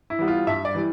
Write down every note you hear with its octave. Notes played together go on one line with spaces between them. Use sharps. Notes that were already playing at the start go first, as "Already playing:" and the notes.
E4
E3 G3 B3
F4
G2 E5
D5
E3 G3